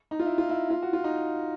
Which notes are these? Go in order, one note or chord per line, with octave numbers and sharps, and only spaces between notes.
D#4
F4
E4
F4
E4
F4
F#4
F4
D#4